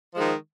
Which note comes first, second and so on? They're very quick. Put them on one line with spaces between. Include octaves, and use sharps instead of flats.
F3 G#3 D#3